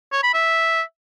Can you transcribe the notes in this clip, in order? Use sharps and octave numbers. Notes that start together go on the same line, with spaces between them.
C#5
B5
E5